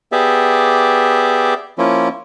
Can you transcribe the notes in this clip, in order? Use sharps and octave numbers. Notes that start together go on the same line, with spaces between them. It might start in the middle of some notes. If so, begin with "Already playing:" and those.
B3 G4 G#4 D5 E5
F3 A#3 C#4 E4 F4